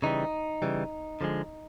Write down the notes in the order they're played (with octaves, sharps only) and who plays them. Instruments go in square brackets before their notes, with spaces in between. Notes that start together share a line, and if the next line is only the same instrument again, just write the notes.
[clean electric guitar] C#3 E3 G3 D#4
C#3 E3 G3
D3 F3 G#3